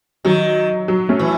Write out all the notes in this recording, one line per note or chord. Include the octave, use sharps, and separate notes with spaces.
D#3 F#3
F#3
A3 C#4
E3